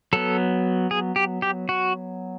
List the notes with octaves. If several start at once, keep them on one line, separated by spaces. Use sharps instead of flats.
F#3 B3 A4
G#4
G4
G4
F#4